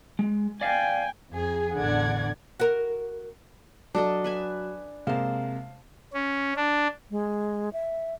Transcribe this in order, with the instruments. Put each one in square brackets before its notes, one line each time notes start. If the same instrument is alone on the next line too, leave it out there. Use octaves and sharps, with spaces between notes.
[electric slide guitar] G#3
[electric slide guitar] D5 F5 [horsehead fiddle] G5 G#5
[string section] F2 G#4
A1 E2 D3 D5 F#5 G#6
[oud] F#4 A#4
[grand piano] F#3 [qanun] D4 A4 D#5
[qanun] B4 E5 G#5
[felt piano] C3 G#3 A#3 [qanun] C5 A5 [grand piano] F5
[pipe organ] C#4
D4
[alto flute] G#3
E5